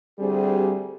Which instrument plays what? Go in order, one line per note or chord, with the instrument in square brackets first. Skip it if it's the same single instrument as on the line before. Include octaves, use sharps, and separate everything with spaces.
[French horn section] D2 G3 C4 G4 G#4